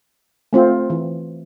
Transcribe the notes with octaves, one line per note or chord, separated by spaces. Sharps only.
A3 C4 F4
E3